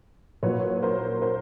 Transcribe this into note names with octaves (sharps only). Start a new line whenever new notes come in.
A#2 F#3 B4 C#5
A#4 C5
A#4 C5